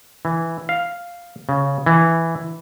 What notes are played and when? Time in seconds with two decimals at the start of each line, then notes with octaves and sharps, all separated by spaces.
0.25 E3
0.69 F5
1.49 C#3
1.86 E3